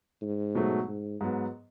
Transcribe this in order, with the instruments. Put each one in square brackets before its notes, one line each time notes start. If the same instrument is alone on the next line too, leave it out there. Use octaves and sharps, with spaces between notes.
[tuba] G#2
[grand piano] B2 F#3 A3
[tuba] G#2
[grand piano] G#2 F#3 B3